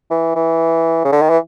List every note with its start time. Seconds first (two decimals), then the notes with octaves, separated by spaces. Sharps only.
0.10 E3
0.35 E3
1.05 C#3
1.12 D3
1.21 D#3
1.29 E3